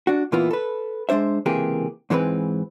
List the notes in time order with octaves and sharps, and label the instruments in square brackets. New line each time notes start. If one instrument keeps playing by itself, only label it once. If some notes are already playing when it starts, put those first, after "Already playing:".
[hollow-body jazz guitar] D4 F#4
A#2 E3 A#3 B3 E4 F4
A4 B4
G#3 A#3 D4 C5 E5
C#2 C3 E3 A#3 G4 G#4
G#2 E3 G#3 C4 B4